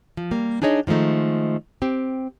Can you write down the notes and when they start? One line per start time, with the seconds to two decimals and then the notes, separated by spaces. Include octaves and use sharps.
0.17 F3
0.31 G3 A#3
0.62 D4 D#4 G#4 C#5 D#5
0.87 D#3 F3 G#3 A3 D#4
1.82 C4 G4